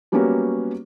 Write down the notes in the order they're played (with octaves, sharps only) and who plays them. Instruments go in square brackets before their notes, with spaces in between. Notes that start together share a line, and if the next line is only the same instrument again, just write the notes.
[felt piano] F#3 G3 A#3 B3 C#4 F#4